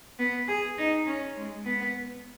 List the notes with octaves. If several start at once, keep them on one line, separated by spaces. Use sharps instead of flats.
B3
G#4
D#4
C#4
G#3
B3